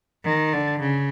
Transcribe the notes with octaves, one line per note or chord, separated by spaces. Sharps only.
D#3
D3
C#3